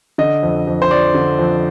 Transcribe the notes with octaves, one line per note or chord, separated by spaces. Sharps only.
D3 D#5
F2
F2
C5
F3 D5
D3
F2